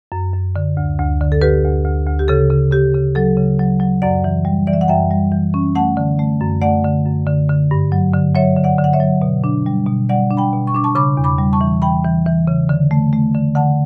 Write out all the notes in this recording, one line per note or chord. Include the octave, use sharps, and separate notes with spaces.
F#2
F#2
D3
D2
D2
D3
A4
D2 G4 B4
D2
D2
D2
G4
C#3 A4
C#3
C#3 G4
C#3
F#3 A4
C#3
F#3
F#3
F#2 D5 F#5
E3
G3
E3 D5
E5
F#5
F#2 E5 G5
G3
E3
C#4
A3 F#5 A5
D3
A3
F#2
A3 D5 F#5
D3
F#2
D3
D3
G2
F#3
D3
F#3 C#5 E5
D3
D5 F#5
D3
F#5
C#5 E5
F#3
B2
D4
G3
B2
G3 D5 F#5
D4
G5 B5
B2
C#6
D4 D6
A5 C#6
C#3 B5 D6
E2
B5 D6
G3
A5 C#6
E3
E3 G5 B5
E3
E3
C#3
D3
A3
A3
D3
D3 F#5 A5